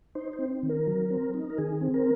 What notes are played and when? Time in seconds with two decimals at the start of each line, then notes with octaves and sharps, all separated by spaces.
0.15 D#4 C5
0.33 C5
0.39 C4
0.63 D#3
0.69 A#4
0.87 F#3
1.10 C4
1.34 D#4
1.50 A#4
1.58 D#3 G#4
1.81 C4
1.94 A#4